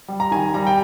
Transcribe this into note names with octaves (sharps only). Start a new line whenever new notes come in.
G3
A#5
D#3 G#5
G3 A#5
G5